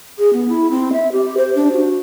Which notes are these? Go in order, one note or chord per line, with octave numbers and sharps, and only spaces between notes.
G#4
B3
E4
C4
E5
G4
C5
D4
F#4